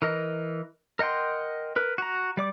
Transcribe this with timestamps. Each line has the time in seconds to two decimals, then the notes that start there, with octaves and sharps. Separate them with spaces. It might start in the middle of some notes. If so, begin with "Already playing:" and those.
0.02 E3 A#4 D#5
0.99 A#4 D#5 F#5 G5 C6
1.76 A#4 B4
1.98 F#4 A#5
2.37 G3 D5 D6